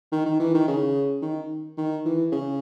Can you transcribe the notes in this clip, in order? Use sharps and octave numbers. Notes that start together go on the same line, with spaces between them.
D#3
D#3
E3
D#3
C#3
D#3
D#3
E3
C#3